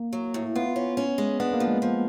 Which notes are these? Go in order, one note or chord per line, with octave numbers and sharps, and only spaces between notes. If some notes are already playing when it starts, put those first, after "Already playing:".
Already playing: A#3
F#3
A2
B3 F4
C#4
C#4
G#3
B3 D4
A#3
F3
G#3
F3